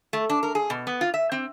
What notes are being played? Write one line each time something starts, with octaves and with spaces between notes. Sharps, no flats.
A3
D4
A#4
G#4
B2
B3
F4
E5
C4